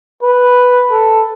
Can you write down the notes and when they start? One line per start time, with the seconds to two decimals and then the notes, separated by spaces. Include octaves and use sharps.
0.23 B4
0.91 A4